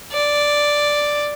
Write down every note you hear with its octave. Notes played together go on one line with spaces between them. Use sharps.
D5